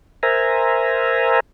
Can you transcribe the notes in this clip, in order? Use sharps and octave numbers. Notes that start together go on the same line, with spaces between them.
A#4 C5 E5 G#5 A#5